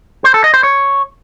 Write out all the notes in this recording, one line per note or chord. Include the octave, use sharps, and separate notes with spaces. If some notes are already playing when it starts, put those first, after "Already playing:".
C5
A4
D#5
C5
C#5